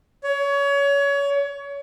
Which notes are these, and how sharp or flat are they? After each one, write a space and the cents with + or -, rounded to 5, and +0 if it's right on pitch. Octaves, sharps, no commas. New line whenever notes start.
C#5 +25